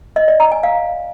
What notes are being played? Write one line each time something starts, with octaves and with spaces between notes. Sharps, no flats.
D#5
D5
A#5
G#5
F5